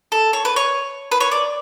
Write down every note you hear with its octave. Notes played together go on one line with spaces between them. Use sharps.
A4
C#5
B4
C#5
B4
C#5
D5